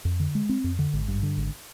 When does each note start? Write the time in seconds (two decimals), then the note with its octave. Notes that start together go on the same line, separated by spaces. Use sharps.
0.05 F2
0.20 D3
0.35 G#3
0.49 C4
0.64 F2
0.79 D3
0.93 G#1
1.08 G2
1.23 D3
1.37 G#1